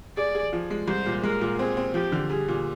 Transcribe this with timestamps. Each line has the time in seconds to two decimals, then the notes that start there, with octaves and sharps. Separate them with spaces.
0.17 G#4 D5
0.35 G#4
0.53 F3
0.70 G#3
0.88 C2 C5
1.06 A#2
1.23 G#3 A#4
1.41 A#2
1.59 C4 G#4
1.77 C4
1.94 F3 G4
2.12 D3
2.30 G3 G#4
2.48 A#2